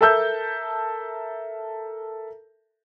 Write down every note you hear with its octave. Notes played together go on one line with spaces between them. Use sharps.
A4 A#4 E5 A5 E6 G6